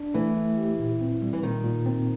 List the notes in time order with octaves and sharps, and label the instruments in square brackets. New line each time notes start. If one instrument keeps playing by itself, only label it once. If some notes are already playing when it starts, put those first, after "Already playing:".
Already playing: [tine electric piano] D4
[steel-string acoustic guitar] E3 [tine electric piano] A3
[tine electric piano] A3
G4
A#2
C4
G3
[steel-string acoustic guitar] E3
[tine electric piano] A#2 [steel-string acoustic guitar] D#3
[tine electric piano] A#2
C4